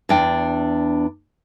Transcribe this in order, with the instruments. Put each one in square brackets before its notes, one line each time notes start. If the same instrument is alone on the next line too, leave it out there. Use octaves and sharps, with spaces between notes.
[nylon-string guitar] E2 D4 G5